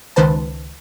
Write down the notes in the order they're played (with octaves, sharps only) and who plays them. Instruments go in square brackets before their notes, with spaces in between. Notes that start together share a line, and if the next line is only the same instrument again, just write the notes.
[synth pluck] C#2 D#3 B4 C5 A5